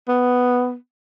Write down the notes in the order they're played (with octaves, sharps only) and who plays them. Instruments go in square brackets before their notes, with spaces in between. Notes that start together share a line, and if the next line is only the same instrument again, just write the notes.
[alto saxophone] B3